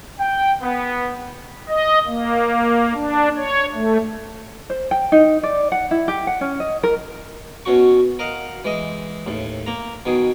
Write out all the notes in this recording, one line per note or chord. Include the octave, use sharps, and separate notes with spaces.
G5
B3
D#5
A#3
D4
C#5
A3
C5
G5
D#4
D5
F#5
E4
G4
F#5
C#4
D#5
A#4
B2 C#4 F#4 C#6
A#4 D#5 F5 F#5
E3 G#3 D#5
D#2 A2
A#3 A#5
B2 D#3 G#4